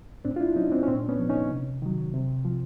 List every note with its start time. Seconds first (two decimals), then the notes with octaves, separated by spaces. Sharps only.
0.25 A2 C4 D4
0.36 F4
0.40 D4 E4
0.56 F#3 C#4 D#4
0.72 C4 D4
0.83 C#4
0.88 A#2 C4
1.03 D4
1.09 B3 C#4
1.19 F3
1.29 C#4 D#4
1.50 C3
1.82 D#3 F#3
2.14 C3
2.45 F3